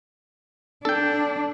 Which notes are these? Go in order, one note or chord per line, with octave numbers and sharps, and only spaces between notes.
D4 A4 G5